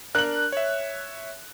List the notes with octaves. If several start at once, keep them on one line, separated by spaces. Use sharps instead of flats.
D4 A#4 F#6 F#7
C#5 E5